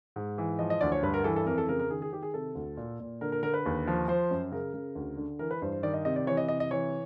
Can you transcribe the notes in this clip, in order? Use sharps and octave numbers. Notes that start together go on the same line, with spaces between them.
G#2
E3
F3 D#5
D#5
D2 D5
C#5
G2 B4
A#4
E3 A4
A4
F2 A#4
A4
C#3 A#4
A#4
D#3 G#4
G#4
D#3 G4
G#4
C3 A4
D2
A#2
A#2
D3 A#4
A#4
D3 A#4
B4
D#2
F3
F3 C5
F#2
C#3 A#4
C#3
D2
D3
E3 A#4
B4
G2 C5
C5
D#3 D5
D#5
C3 D#5
D5
E3 C#5
D#5
C3 D#5
D#5
E3 C#5